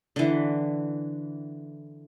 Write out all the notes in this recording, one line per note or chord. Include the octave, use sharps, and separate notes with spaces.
D3 E3